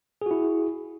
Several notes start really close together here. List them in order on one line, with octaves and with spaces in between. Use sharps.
G#4 F#4 E4